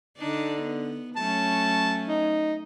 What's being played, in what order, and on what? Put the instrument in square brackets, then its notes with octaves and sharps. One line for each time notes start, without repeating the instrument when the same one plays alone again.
[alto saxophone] D3 [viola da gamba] D4 D#4
[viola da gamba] B3
[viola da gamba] F#3 A3 C#4 [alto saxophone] A5
[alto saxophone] D#4